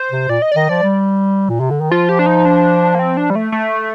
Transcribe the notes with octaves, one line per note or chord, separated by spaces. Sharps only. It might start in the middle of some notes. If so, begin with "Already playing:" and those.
Already playing: C5
C3
A#2 D5
D#5
D5
D#3 D#5
F3 D5
G3
A#2
C3
D3
D#3
F3 F4
G4
D4
D#4
D4
A#3
C4
D4
G3
A3
A3